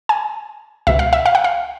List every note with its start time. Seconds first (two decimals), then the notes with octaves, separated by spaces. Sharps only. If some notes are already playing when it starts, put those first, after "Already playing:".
0.09 G#5
0.87 C#2 B2 E5
0.99 F5
1.13 E5
1.26 F5
1.35 F#5
1.44 F5